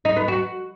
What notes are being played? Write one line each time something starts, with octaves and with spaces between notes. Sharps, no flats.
D#4
B3
F#4